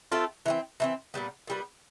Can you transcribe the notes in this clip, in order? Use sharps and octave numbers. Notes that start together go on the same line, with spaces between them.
A3 C4 F4 A4
E3 A3 C4
E3 A3 C4
A#2 G3 B3
A#2 G3 B3